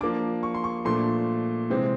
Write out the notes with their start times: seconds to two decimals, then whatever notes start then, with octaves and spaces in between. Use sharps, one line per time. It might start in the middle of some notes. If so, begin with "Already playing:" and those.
0.01 F3 A#3 D4 D6
0.43 C#6
0.54 C6
0.64 C#6
0.85 A#2 F3 A3 D4 C6
1.70 C3 E3 G#3 C4